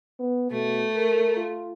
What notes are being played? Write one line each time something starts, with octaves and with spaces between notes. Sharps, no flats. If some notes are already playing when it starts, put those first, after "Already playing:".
B3
B2 A3
A#4
F4